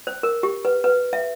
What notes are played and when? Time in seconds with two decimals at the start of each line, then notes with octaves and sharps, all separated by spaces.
0.07 C5
0.23 A#4
0.43 G4
0.65 B4
0.84 B4
1.13 E5